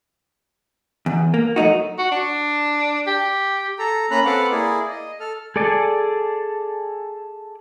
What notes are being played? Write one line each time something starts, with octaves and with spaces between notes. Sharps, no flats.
E2
A#3
F#3 A3 D#4 F#4
F#4
D4
G4
A4 A#5
A#3 C#4 A#5 B5 F#6
C4 A4 B4 F5 F#5 D6
A#3 E4 G#4 D5
D#5
A4 F6
G#4 A4 D5 G#5 A5